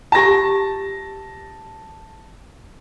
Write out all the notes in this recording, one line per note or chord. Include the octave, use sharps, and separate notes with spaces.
F4 G4 A5 A#6